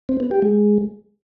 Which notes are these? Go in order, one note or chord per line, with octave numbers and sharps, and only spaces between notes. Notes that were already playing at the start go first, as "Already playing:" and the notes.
C4
B3
G4
G#3